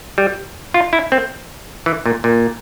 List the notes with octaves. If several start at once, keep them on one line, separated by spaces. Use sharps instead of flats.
G3
F4
E4
C4
E3
A#2
A#2